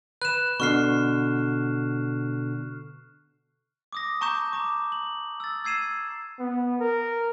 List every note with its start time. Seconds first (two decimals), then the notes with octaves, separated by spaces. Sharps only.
0.22 B4 F#6 E7
0.60 B2 D3 C#6 F6 C7
3.93 D6 D#6 A#6
4.21 A5 A#5 C#6 D6 G6 E7
4.53 A#5 D6
4.92 F#7
5.40 E6 A6
5.65 E6 G#6 C7 D#7 E7
6.39 B3
6.80 A#4